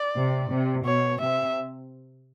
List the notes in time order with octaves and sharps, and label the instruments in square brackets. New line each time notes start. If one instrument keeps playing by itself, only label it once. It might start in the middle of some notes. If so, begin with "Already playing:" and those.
Already playing: [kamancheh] D5
[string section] C3
C3
[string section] B2 [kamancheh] C#5
[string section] C3 [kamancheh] E5